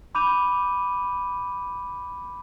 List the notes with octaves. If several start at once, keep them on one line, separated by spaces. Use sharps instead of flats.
B5 D6 G6 D#7 F7